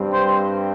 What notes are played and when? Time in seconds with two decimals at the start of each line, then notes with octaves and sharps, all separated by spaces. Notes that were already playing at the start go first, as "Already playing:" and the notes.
Already playing: G2 G3 C4
0.12 C5